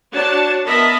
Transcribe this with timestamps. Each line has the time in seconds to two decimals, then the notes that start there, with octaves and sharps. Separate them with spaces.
0.14 D4 F#4 C#5 A5
0.65 B3 A#4 D#5 E5 A5 B5